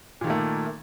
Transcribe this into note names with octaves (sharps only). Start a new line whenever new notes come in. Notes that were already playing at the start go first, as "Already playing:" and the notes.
A#2 D#3 A3 A#3